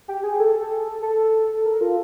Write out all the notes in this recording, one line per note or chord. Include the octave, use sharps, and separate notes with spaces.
G4
G#4
A4
A4
A#4
F4